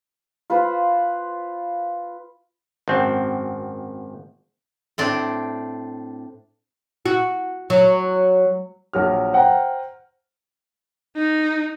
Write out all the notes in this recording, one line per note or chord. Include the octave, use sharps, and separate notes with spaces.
F4 B4 C5
G#1 F#2 C4
A2 C4 D4
F#4
F#3
A#1 F#3 F6
C5 F#5 G5 A#5
D#4